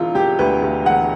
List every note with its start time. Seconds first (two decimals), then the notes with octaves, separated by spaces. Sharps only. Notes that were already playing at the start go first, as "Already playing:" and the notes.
Already playing: E1 D3 E4 F4
0.15 E1 G4
0.39 D2 B4
0.62 D2
0.86 E1 F#5